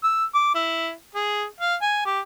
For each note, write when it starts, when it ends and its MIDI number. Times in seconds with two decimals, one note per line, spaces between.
0.04 0.24 88
0.34 0.50 86
0.54 0.92 64
1.14 1.45 68
1.60 1.75 77
1.82 2.01 80
2.05 2.20 67